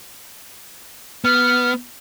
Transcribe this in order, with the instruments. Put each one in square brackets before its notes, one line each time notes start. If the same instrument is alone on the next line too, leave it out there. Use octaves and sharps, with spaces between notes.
[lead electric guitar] B3 [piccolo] F6